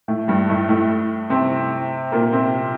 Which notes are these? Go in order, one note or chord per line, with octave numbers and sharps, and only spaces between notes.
A2 A3
G2 G3
A2 A3
A2 A3
C3 C4
A#2 A#3
C3 C4